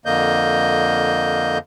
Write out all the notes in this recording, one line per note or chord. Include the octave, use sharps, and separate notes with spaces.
F2 D3 A#3 D#5 G6